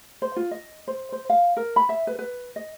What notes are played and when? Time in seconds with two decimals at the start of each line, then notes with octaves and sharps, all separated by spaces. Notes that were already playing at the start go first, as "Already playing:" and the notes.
0.22 C5
0.36 F4
0.51 D#5
0.88 C5
1.12 C5
1.30 F5
1.57 A#4
1.76 B5
1.89 E5
2.07 B4
2.19 B4
2.56 D#5